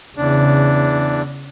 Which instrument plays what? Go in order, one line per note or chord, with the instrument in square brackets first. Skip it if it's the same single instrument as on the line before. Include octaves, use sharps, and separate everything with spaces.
[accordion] E2 D4 [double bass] C#3